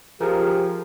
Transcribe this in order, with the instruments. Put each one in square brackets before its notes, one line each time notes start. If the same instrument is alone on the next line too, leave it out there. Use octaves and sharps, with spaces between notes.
[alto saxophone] F3 [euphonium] G4 [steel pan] G#4 A#4